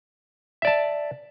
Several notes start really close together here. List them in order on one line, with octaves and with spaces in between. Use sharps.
E5 D5 A5